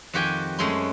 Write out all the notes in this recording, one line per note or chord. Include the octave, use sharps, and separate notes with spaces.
F2 D#3 F#4 G4 G5 G#5
F#2 G#3 A3 C#4 C6